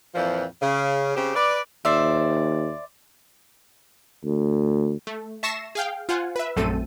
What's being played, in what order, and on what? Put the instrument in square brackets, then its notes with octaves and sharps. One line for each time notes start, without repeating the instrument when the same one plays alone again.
[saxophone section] F2 A#2 E3 F3
C#3
C#3 C4 G4
B4 D5
[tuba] D#2 [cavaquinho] C5 D5 E5
[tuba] D2
[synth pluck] A3
E5 A5 C#6 A#6 C7 E7
G#4 F5 G5
F4 C5 F#5 G#5
B4 E5
A#1 F#2 A3 C4 A4 D#7